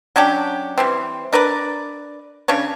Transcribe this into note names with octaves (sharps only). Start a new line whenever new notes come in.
F#3 C#4 D4 G4
E3 G3 C4
D4 A#4 B4 D5
C#3 C#4 D4 C#5